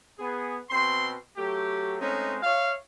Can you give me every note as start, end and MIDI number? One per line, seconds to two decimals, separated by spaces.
0.19 0.57 59
0.19 0.57 68
0.71 1.12 47
0.71 1.12 60
0.71 1.12 84
1.37 1.96 54
1.37 1.96 57
1.37 1.96 67
2.01 2.38 56
2.01 2.38 57
2.01 2.38 60
2.01 2.38 61
2.01 2.38 63
2.43 2.73 73
2.43 2.73 76
2.43 2.73 77